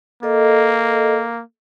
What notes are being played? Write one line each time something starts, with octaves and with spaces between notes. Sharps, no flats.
A#3 A4 D#5